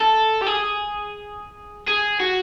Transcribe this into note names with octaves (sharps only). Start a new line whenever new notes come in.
A4
G4
G#4
G#4
F#4